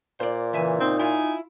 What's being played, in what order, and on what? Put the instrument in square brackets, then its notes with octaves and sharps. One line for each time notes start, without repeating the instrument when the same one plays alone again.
[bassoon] A#2 [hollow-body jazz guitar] C5 D5
[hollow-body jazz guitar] C#3 E5 G#5 [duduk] E3
[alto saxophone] C4 [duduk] D#4
[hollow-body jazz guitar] E4 F4 [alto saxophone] G#5